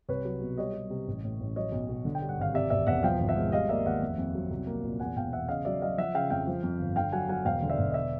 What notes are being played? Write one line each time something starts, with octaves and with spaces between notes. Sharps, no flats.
C2 B4 C#5
F#3
B2
G3 C#5 D#5
G3
C3
A1
A2
A1
F#3 C#5 D#5
B1
B2
D3
G5
G2
F#5
G#1 F5
C3 D5 E5
E1 D5 E5
E1 E5 F#5
F3 F5 G5
G#1
E5 F#5
G#3
G3 D#5 F5
A#3 D5 E5
D#2 E5 F#5
F2
F2
F#3
C2
A#3
A#2
E2 F#5 G#5
E1 F5 G5
E2 E5 F#5
C#3 D#5 F5
F#3 D5 E5
F#3 D#5 F5
F3 E5 F#5
C#3 F5 G5
F2 F5 G5
F3
F2
G1
D3 F5 G5
F#3 F#5 G#5
F#3 F#5 G#5
E1 F5 G5
D3
D5 E5
E1
D#5
D5 E5